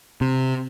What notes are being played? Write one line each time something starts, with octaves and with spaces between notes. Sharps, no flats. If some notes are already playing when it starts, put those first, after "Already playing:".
C3